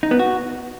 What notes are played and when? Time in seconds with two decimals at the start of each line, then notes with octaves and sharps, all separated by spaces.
0.03 D#4
0.11 B3
0.19 F#4